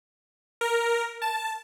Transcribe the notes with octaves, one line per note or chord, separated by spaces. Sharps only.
A#4
A5